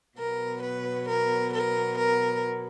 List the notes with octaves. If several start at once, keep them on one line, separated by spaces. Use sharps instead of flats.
B2 F#3 B3 A#4
B4
A#4
A#4
A#4